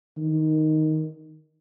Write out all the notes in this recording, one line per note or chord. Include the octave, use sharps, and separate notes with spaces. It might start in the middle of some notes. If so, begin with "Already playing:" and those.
D#3